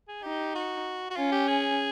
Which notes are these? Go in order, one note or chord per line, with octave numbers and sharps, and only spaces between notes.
G#4
D#4 G4
F#4
F#4
C#4 F4
G4
G#4